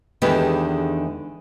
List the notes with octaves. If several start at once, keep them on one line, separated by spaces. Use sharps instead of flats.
E2 D3 D#3 G#3 G4 B4